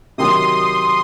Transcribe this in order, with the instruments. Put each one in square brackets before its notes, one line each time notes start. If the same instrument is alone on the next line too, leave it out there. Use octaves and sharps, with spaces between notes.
[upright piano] C3 D#3 F#3 [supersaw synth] C6 D#6